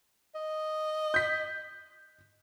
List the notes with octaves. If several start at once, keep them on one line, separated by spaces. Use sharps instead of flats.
D#5
G6 B6